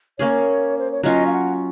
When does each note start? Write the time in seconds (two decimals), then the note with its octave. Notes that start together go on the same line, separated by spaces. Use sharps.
0.18 A#3 C#4 G#4 C#5
0.79 C5
0.92 C#5
1.03 F#3 C#4 F4 D#5
1.27 F5
1.33 F#5